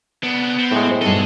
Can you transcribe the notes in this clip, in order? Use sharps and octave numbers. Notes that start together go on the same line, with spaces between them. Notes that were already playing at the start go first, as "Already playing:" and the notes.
C#3 B3 D4
C4
A2 G#3
A#4 C5
G2 B2 D#4 G#4 A4 D#5